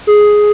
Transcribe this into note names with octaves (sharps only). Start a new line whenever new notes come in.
G#4